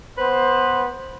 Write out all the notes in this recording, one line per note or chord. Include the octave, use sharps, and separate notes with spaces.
B3 B4 C5